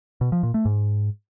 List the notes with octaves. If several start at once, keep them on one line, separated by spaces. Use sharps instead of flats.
B2
F3
A#2
A3
G#2